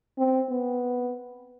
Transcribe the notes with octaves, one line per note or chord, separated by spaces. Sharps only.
C4
B3